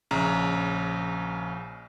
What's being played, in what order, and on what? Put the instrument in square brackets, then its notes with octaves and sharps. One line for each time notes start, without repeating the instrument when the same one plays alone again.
[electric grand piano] A#1 C#3 A#5